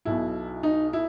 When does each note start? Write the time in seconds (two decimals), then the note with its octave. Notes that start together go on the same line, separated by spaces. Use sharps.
0.05 B1 B2 E4
0.63 D#4
0.93 E4